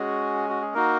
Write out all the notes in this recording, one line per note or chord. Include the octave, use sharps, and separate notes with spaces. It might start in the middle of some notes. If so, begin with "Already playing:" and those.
Already playing: G#3 C#4 F#4 G#4
F#4
G#4
A#3 D#4 F#4 A#4